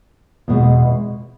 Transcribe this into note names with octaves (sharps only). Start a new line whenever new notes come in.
E2 B2 G#3